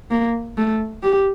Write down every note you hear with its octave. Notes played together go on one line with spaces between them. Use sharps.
A#3
A3
G4